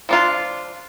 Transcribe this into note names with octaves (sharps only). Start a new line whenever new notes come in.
F3 D4 F4